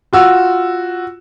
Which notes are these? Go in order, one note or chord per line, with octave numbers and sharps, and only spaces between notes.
F4 F#4 E6